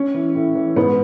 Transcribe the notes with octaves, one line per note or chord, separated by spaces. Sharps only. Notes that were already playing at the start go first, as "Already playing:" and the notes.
Already playing: C#4
E3
A2
E3
G#2 B3